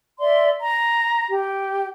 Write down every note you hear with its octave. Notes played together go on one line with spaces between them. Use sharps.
D5 E5 C6
A#5
G4